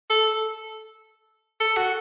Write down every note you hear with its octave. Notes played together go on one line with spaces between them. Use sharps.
A4
A4
F#4